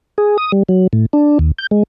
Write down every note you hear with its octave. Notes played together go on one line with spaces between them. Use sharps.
G#4
D#6
G3
F#3
A2
D4
D#2
G6
G#3